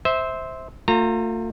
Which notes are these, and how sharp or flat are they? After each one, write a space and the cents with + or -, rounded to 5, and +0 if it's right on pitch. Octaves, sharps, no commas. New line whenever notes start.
C5 +0 E5 -20
A3 +40 F4 +30 A#5 -20